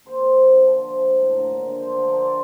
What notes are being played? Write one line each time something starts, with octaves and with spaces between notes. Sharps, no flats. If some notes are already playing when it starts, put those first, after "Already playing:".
A#3 C5
C3
C3
D3
F3
F3
F3
A3
A2
D3 A#4
A#3
D3
A3 C5
D3
A#4
F3 C5
D3 D5